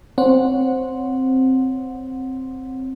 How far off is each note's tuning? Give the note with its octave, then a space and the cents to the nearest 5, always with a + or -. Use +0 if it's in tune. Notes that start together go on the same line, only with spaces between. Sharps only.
C4 +0 C#5 +0 F#5 -15